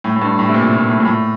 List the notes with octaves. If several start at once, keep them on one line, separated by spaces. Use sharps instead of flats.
A2
A2
G2
A2
C3
A#2
A#2
A2
A#2
A2